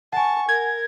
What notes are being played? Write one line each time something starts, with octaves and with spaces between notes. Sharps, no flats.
F#5 G#5 A5 C#6
A#4 G#6